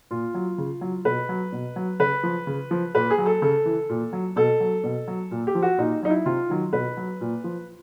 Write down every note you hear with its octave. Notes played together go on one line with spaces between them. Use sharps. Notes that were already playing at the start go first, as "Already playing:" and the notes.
A#2 F4
F#3
C#3
F#3
B2 B4
F#3
B2
F#3
C#3 B4
F3
C#3
F3
A#2 B4
G#4
F#3
A4
C#3 A4
E3
A#2
F#3
B2 A4
F#3
B2
F#3
A#2
G4
F3
F#4
A#2 D#4
F#3 D#4
E4
C3 F4
D#3 F#3
B2 B4
F#3
A#2
F3